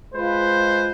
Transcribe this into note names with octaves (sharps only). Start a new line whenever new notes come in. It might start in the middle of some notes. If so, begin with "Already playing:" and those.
G#3 F4 B4 C5